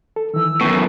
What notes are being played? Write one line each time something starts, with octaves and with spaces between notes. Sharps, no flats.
A4
D#3 E3 E6
F#2 A2 B3 C#6